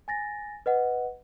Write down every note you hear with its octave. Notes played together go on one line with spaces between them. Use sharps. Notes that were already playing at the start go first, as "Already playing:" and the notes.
G#5 A6 A#6
B4 D#5 F#5